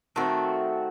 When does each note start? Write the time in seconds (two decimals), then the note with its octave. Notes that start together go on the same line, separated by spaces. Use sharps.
0.16 D#3 A3 C4 F#4